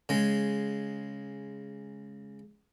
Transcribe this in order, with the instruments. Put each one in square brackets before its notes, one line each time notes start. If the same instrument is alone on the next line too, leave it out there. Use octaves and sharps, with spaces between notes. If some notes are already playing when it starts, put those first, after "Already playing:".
[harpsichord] C#3 G#3